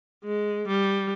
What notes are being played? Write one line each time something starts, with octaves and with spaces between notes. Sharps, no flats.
G#3
G3